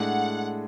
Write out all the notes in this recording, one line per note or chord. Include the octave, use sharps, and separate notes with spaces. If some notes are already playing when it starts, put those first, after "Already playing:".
Already playing: A2 G#3 D4 F#5